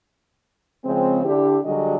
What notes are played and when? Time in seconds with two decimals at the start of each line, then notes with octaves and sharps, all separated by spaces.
0.84 C#3 F3 G#3 C4
1.24 D3 D4 E4 G4
1.64 D3 F#3 G3 F#4 G#4 D#5